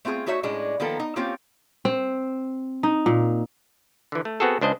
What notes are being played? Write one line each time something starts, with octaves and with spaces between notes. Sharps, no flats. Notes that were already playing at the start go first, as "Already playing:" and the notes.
A3 C4 F4 G#4
A3 D#4 F#4 C#5 E5
A2 G#3 C#4 D4
D#3 F3 A#3 B3 A4
D#4
A#3 C4 C#4 F4 G4
C4
D#4
A#2
D3 E3
A3
B3 C4 F#4 G#4 A4
C#2 D4 C5 D#5 G#5